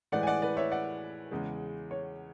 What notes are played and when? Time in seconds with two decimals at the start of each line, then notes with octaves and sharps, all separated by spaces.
0.12 A2 E3 G#3 D5 F#5
0.23 G#5
0.27 D5 F#5
0.42 B4 D5
0.57 C#5 E5
0.72 D5 F#5
1.31 E2 C#3 G#3
1.91 C#5